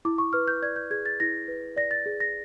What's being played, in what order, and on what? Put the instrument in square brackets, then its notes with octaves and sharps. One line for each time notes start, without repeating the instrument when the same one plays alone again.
[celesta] E4 D6
C#6
B4 F6
G6
D5 G#6
G6
G#4 G#6
A6
E4 A#6
B4
D5 A#6
A6
G#4
A#6